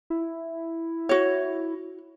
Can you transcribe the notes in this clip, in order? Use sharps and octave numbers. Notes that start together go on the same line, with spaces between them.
E4
F#4 C#5